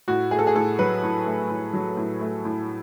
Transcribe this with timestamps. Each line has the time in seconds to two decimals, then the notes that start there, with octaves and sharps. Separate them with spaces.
0.08 A2 F#4
0.31 A3 G#4
0.39 A4
0.47 G#4
0.55 A2 A4
0.79 F#3 B4
1.03 A2
1.26 A3
1.50 A2
1.73 F#3
1.97 A2
2.21 A3
2.45 A2